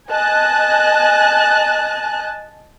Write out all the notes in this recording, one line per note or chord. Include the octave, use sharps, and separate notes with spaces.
D#5 G#5 A5 F#6